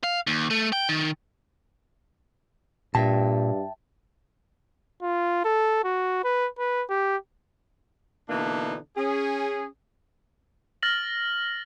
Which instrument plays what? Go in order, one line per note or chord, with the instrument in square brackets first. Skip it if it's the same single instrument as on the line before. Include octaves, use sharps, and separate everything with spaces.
[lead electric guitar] F5
D#2
A3
G5
D#3
[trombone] G2 [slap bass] A#2 [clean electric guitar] E5 G5 A5
[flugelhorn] F4
A4
F#4
B4
B4
G4
[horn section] B2 D3 E3 A#3 D4 D#4
C#4 G#4
[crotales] F6 A6 A#6 F#7